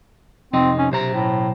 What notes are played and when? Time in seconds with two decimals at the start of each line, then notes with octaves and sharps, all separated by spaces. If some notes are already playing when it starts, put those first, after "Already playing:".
0.54 F2 C3 C4 D#4
0.78 C#4
0.92 B1 C3 C5 A#5
1.14 A2